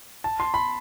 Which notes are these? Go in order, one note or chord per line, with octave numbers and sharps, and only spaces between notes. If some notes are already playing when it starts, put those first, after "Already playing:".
A5
C6
B5